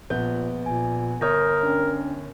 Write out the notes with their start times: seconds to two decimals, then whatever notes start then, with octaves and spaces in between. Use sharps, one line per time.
0.10 A#1 A#2 B3 G6
0.66 A#2 G#5
1.21 G1 A#4 C#5 D#6 G6 A#6
1.63 C#4 D4